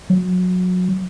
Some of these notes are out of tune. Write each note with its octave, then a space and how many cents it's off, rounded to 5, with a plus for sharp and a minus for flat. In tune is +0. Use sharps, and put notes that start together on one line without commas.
F#3 -25